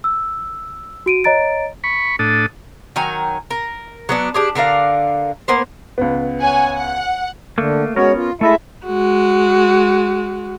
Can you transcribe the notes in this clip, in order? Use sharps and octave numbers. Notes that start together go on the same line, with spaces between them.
E6
F#4 D7 D#7
C#5 D#5 A#5 A6 D7
B5 C#6
A2 D4 A4 D#6
D#3 F#3 G#5 A#5
A#4
F#3 B3 D4
D4 G4 G#4
D3 D4 A#4 F5
A#3 B3 C5
C#2 B3
C#5 F#5 G#5
F#5
D3 A3 A#3
G#3 B3 C#4 F#4 A#4 C#5
F4
G#3 A3 E4 A4 D#5 E5
G#3 F#4